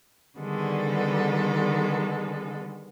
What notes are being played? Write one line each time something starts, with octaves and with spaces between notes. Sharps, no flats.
D3 D#3 G3 G#3 B3 A4